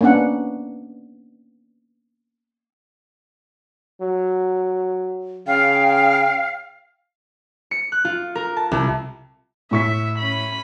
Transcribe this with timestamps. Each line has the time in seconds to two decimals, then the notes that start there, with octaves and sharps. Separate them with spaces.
0.01 A#3 B3 C#4 D4 F#5
4.01 F#3
5.47 C#3 F5 G5
7.71 C#7
7.92 F#6
8.05 F4
8.35 A#4
8.56 A5
8.71 C2
9.71 A2 E5 C#6 B6
10.18 C#4 B5